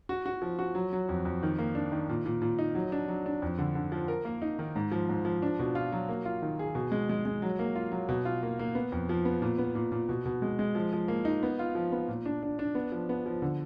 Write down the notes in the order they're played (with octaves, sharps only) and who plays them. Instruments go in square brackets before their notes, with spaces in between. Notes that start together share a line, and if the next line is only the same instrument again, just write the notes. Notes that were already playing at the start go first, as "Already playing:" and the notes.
[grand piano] F#4
F#4
F3
F#4
F#3
F#3
F2
F2
D#3
A#3
D4
D#3
A#2
A#2
A#2
D#4
F#3
D4
F#3
D4
F2
D3
D3
F3
A#4
A#3
D#4
D#3
G#2
F3
G#2
F3
D4
B2
F4
F#3
A#3
F4
D#3
G#4
B2
G#3
G#3
G#3
F#3
A#3
F4
F#3
B2
F4
A#3
A#3
B3
F2
F3
B3
A#2
B3
A#2
A#2
B2
B2
G#3
G#3
F3
F3
A#3
D#4
B3
F4
F3
B3
A#2
D4
D4
D4
B3
F3
B3
F3
D3